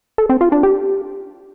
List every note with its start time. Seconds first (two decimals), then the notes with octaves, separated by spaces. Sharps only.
0.18 A4
0.29 C4
0.41 F4
0.52 D4
0.63 G4